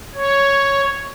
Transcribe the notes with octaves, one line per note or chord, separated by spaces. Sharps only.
C#5